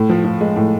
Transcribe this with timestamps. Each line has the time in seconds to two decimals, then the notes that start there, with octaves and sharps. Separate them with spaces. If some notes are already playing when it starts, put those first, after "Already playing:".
Already playing: A2
0.09 F3
0.25 F3
0.41 G#3
0.56 A2